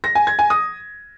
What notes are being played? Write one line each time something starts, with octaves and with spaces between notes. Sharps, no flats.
A#6
G#5
G#6
G#5
D#6